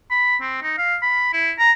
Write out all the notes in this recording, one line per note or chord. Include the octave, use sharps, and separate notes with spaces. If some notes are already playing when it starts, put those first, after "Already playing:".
B5
C4
D#4
F5
B5
E4
A#5